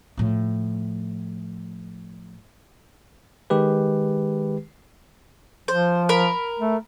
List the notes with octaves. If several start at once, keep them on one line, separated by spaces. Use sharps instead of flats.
A2 F3
D#3 G#3 G4 B4
F3 C5
A#4 B5
A3